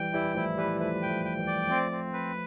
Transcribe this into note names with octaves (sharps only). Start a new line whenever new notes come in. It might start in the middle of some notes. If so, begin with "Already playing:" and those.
Already playing: E3 G3 G5
E3 G3 E4
F3 A3 E4
E3 G3 B4
F3 A3 B4
G5
F3 A3
G5
E3 G3
D5
F3 A3 C4
C4
B4